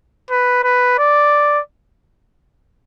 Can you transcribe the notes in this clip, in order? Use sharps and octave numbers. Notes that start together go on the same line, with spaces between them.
B4
B4
D5